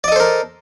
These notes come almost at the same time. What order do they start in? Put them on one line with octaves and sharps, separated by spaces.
D5 D#5 A4 C5 A#4